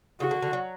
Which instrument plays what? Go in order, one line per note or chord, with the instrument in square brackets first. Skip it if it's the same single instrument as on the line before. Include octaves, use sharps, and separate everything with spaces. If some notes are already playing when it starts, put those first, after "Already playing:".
[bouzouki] C#3 [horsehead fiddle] F#4
[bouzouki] D3
D3
F#3